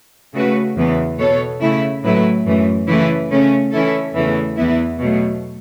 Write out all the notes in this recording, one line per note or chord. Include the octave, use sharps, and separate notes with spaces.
C#3 A3 F#4 B4
E2 C#3 E3 B3
B2 B3 A4 C#5
C#3 A3 E4
A2 F#3 A3 E4 B4
F#2 E3 A3
C#3 E3 A3 E4 B4
C#3 A3 C#4
E3 C#4 E4 A4
E2 C#3 E3 A3
E2 E3 B3 E4
B2 F#3 A3